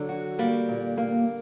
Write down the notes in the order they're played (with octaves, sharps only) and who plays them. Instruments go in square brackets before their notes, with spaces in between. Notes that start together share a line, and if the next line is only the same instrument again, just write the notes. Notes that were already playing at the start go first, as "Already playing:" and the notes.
Already playing: [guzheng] D3 [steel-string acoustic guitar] F#3
[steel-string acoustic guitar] F#4
[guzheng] G3 [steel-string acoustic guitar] A#3
[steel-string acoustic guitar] A#2
A#3